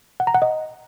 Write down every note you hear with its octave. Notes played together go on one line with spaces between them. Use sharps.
F#5
A#5
F#5
D#5